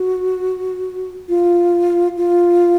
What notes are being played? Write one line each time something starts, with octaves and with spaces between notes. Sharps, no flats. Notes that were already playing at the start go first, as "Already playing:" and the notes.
Already playing: F#4
F4
F4